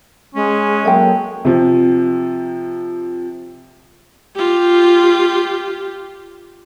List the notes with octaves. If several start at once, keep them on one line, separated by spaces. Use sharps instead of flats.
G#3 C#4
F#3 A#3 A4 E5 G5
C3 F3
F4 G4